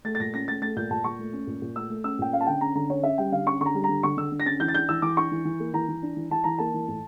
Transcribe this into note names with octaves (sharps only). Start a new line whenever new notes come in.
A3 A6
A6
A#2 A#6
C#4 A#6
A3 A6
A3 A6
A#2 G6
A#2 A5
A#2 C#6
A3
C#4
A#2
A#2
A3 E6
A3
C#4 E6
A#2 G5
C#4 F5
A5
D3 G5
C#4 A#5
D3 A#5
C#4 C#5
C#4 E5
G3 G5
D3 F5
C#4 C#6
D3 C#6
A#5
G3
A#5
D3
D3 C#6
D3 E6
D3
A#6
C#4 A6
E3 G6
A6
D4 G6
E3 E6
E3 D6
D4 C#6
E3
E3
A#3
E3 A#5
E3
D4
E3
E3 A5
E3 A#5
A#3 A5
E3
A2